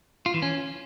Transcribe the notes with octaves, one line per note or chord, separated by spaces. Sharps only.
F4
E3
C#4